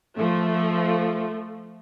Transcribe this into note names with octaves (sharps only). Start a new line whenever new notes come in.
F3 A3